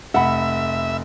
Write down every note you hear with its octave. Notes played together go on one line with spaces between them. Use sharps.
F1 E5 F#5 B5